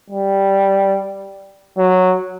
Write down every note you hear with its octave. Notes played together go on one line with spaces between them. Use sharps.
G3
F#3